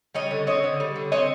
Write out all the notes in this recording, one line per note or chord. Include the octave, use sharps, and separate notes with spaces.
G3 C#5 D#5
D3
C4 C#5 D#5
D3
G3
D3
C4 C#5 D#5